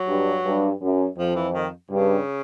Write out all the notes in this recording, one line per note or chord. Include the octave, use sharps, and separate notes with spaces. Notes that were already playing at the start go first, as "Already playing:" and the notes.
Already playing: F#3
G2
G2
F#2
F2 F3
E3
D#3
G2 C#3